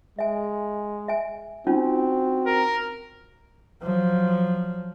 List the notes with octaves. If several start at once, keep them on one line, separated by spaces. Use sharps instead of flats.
G#3 E5 G#5
E5 G#5
C4 C#4 D#4 F4 F#4
A#4
F3 F#3